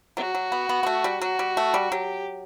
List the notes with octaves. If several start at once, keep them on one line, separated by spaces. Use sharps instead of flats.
F#3 F#4
F#3
B3
B3
B3
A3
G3
F#3 F#4
G3
A3
G3
F#3 G4